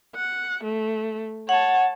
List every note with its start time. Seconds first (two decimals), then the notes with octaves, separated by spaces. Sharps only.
0.15 F#5
0.64 A3
1.49 C#5 F#5 A5